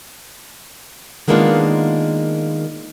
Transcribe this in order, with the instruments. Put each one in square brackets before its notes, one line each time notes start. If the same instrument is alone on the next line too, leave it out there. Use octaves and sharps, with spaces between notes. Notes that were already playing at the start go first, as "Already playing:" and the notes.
[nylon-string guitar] D#3 G#3 A#3 B3 D4 F4